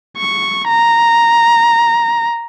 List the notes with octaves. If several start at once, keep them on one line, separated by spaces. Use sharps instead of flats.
C#6
A#5